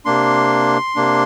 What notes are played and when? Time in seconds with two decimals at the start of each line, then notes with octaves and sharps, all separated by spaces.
0.05 C3 A#3 D4 C6
0.96 C3 A#3 D4